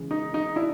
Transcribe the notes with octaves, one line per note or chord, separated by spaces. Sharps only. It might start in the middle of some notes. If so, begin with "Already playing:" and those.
Already playing: C#3 E3 G#3
D#4
D#4
D4 E4